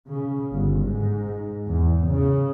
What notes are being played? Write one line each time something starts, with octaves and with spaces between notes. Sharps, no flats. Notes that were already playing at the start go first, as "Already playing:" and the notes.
C#3
G1
G#2
E2
C#3